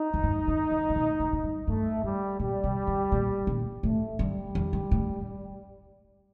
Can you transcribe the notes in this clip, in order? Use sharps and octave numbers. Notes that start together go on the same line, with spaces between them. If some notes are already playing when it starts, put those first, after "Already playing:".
Already playing: D#4
F2
G2
G2
G2
A2
A#2
A2
A2
G2
G2 A3
A2 G3
A#2 G3
C3
G2
A#2
A#2
A2 A3
G2 G3
F2
G2
A2